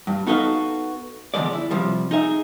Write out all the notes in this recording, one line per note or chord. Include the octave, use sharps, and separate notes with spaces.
G2
B3 D#4 F#4 A4 B4 F5
E2 G#2 D3 F3 G#3 D5
E4
C3 F3 G3
D#4 G#4 E5